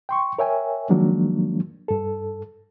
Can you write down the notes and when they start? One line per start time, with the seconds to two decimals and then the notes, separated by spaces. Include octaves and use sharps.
0.09 G5 C6 C#6
0.39 A#4 C#5 E5 G5 G#5
0.89 D#3 F3 F#3 G#3 A#3 D4
1.88 G2 A4